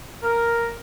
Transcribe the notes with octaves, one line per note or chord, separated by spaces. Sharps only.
A#4